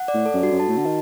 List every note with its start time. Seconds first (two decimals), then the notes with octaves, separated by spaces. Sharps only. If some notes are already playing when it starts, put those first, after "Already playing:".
Already playing: F#5
0.08 D5
0.14 A2
0.26 A4
0.34 F#2
0.43 G2 F#4
0.52 F#2
0.60 G2 A5
0.68 A2
0.77 D3 F#4
0.85 D#3